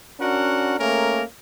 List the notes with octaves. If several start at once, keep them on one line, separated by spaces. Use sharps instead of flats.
C#4 D4 F#4 A#4 F#5
A3 A#3 C#4 G#4 A#4